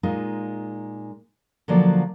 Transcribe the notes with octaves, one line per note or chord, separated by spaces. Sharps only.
A#2 G#3 D#4 F4
D3 F3 F#3 A#3 D5